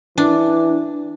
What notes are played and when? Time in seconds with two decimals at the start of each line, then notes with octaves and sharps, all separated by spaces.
0.18 E3 D4